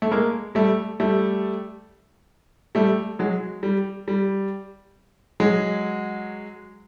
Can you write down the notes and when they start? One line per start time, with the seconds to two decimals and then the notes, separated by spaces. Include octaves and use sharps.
0.02 A3
0.12 G#3 A#3
0.55 G3 A3
1.00 G3 A3
2.75 G3 A3
3.19 F#3 G#3
3.63 G3
4.08 G3
5.40 F#3 G#3